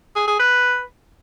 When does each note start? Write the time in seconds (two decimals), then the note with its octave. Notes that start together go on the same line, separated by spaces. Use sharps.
0.16 G#4
0.28 G#4
0.39 B4